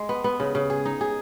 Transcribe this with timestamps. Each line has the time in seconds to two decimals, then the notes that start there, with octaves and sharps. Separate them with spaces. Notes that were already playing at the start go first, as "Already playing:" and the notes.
Already playing: G#3
0.09 B3
0.24 B3
0.40 C#3
0.55 C#3
0.70 G#4
0.85 D#4
1.01 G#4